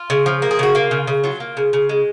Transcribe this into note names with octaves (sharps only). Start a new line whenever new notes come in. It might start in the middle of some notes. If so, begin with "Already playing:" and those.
Already playing: F4
C#3
F3
A#3
G#4
C#3 F#4
A#3 F4
C#3
C#3
F#3 F4
A#3
C#3
C#3
G#3